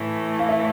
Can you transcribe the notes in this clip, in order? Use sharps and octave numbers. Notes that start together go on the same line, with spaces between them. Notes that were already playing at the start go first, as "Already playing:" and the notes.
Already playing: A2 E3 A3
F5
E5